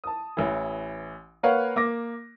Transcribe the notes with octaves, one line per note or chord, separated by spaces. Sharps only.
A5 D#6
A1 E3
A#3 A#4 B4 C#5 F5 F#5
A#3 D6 A#6